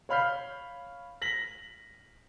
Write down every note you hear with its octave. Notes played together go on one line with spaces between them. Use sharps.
C#5 F5 B5 F6 G6 C7
A#6 B6 F#7